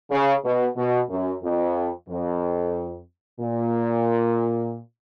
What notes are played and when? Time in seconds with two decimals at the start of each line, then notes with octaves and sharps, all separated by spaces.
0.11 C#3
0.45 B2
0.77 B2
1.10 F#2
1.43 F2
2.09 F2
3.40 A#2